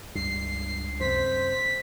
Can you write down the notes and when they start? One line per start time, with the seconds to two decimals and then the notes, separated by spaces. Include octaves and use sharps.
0.15 C#2 G2 C7
1.01 F#2 C3 C5 B6